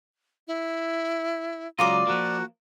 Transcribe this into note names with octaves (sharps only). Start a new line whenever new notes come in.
E4
C#2 F#3 F4 D5 D#5 A#5 D6
F3 A#3 F#4